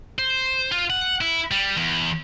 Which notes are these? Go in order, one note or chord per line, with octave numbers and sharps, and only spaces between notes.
C5
F4
F#5
E4
G3
E2